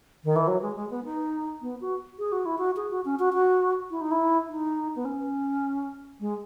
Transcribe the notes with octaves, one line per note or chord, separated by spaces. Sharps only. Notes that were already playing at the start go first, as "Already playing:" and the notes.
D#3
E3
F#3
G#3
G#3
B3
D#4
B3
F#4
G#4
F#4
E4
F#4
G#4
F#4
C#4
F#4
F#4
E4
D#4
E4
D#4
B3
C#4
G#3